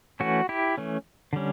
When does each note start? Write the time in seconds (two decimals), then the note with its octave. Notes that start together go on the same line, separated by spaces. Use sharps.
0.20 E3 A3 C#4 F#4
0.49 E4 G4
0.77 E3 A3 C#4
1.33 D3 G3 C#4